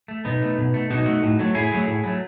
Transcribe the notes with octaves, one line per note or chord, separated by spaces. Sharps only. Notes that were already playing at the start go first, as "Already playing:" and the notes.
A3
B2 B3 D#4
A3
B2
A3
B2 D#4 F#4
A3
A2
F#3 A3
A2 E4 G#4
F#3 A3
A2
F#3 A3